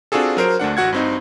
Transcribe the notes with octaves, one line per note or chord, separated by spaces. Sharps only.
C4 D4 F4 F#4 G#4 A4
F#3 A#4 C5 D7
D2 A3 D4 F#5
A1 F#4 F#5 G#6
G2 C4 D#4